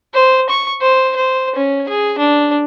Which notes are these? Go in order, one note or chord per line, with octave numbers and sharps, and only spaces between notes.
C5
C#6
C5
C5
C#4
G#4
D4